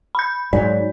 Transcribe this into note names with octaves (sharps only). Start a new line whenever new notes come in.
B5 G6
G#2 F#3 D5